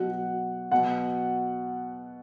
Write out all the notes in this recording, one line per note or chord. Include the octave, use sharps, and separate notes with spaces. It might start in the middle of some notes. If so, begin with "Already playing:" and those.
Already playing: B2 F#3 F#5
B2 F#3 F#5